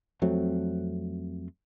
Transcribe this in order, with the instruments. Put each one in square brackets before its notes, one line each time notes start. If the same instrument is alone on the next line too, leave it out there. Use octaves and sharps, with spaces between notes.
[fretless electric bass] F2 F#3 A3 C4